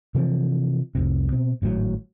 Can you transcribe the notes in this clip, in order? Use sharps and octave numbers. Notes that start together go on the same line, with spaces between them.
C3 E3 F3 C4
C2 F2 C3
B2 C4
G#1 A2 D#3 F#3